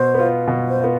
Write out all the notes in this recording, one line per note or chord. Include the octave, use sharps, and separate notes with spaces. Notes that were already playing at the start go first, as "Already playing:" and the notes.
Already playing: B2 C5
B3 F4
B2
C5
B3 F4